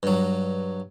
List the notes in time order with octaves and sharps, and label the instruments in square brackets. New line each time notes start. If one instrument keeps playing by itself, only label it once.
[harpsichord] G2 F#3